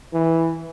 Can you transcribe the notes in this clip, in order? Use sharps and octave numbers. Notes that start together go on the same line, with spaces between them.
E3